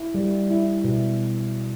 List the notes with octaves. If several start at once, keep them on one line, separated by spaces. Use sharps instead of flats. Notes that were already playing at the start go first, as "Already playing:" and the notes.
Already playing: E4
G3
E4
B2